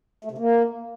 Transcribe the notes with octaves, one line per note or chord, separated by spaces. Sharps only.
A3
C3
A#3